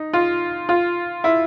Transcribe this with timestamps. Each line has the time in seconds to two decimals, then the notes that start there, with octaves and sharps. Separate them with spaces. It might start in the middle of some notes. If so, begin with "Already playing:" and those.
Already playing: D#4
0.13 F4
0.69 F4
1.24 E4